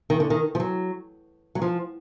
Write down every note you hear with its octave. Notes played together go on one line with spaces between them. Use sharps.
D#3
D3
D#3
F3
F#3
F#3
F3